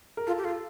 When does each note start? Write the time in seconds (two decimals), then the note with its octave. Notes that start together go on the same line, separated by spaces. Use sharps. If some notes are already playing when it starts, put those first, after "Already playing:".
0.17 A#4
0.27 F4 A4
0.38 G4
0.44 F4 A4